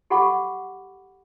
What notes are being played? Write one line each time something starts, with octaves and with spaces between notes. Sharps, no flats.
G4 A4 F#5 B5 C#6 D6